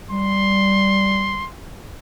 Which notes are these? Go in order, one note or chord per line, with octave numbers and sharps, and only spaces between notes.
G3 C6